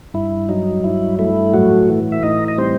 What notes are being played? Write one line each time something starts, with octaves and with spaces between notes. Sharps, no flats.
G2 E4
F#3 D#4
G2 E4
A3 E4
A2 F#3 F#4
E3
E5
A2 D#4 D#5
D#5
G3 C4 C5